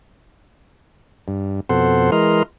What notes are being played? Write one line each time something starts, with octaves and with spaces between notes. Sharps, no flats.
G2
F2 B2 A4 C5 F#5 C6
E3 G#3 A#4 D#5 C6 F6